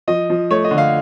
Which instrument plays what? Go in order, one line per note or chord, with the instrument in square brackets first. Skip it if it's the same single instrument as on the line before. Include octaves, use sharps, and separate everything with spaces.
[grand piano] F3 D#5
F3
A3 C#5
D#5
D3
F5